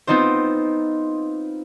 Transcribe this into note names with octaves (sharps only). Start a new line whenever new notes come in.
B3 C4 D#4 F4 C5